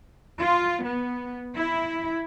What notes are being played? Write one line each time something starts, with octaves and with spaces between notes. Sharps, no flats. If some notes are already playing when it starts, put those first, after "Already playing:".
F4
B3
E4